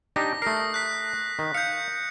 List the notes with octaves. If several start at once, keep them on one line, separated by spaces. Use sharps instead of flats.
D4 D#4 G4 A#6
A3 A#4 D#6 A#6 C7
F#6 B6 C7
D#3
F5 G6 C#7